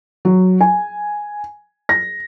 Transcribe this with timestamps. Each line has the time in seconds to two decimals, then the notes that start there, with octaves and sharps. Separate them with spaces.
0.25 F#3
0.61 G#5
1.89 A#6